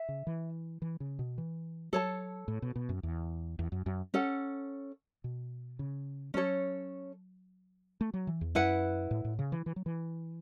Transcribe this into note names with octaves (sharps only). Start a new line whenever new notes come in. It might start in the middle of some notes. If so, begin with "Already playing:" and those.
Already playing: E5
C#3
E3
E3
C#3
B2
E3
F#3 A4 C#5 A5
A2
B2
B2
F#2
E2
E2
F#2
F#2
C#4 A4 F#5
B2
C#3
F#3 C#4 A4 C#5
A3
F#3
E3
E2
F#2 E4 B4 F#5
A2
A2
C#3
E3
E3
F#3
E3